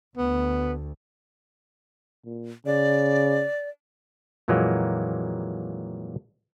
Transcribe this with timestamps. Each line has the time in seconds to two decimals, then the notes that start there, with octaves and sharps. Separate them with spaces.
0.17 D2 B3
2.25 A#2
2.66 C#3 D5
4.48 F2 A#2 E3 F#3 G#3 A#3